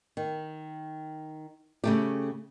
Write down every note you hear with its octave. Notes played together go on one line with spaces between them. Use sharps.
D#3
C#3 A3 G4